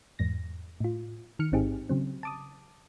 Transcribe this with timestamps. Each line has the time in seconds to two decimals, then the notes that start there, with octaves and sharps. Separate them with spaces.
0.19 E2 G#2 A#6
0.80 A2 F4
1.39 D#3 F6 C#7
1.52 A1 G#2 C4 D#4 G4 G#4
1.89 C#3 F#3 C4
2.23 A5 D6 D#6